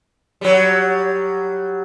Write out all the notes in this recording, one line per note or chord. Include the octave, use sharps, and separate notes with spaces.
F#3 G3